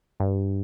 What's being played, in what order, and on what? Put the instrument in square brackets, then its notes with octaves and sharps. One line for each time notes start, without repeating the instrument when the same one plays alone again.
[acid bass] G2